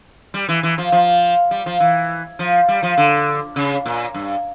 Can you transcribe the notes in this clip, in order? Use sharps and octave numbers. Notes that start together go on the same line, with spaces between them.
G3
E3
E3
F3
F3
G3
F3
E3
F3
G3
F3
D3
C#3
A#2
G2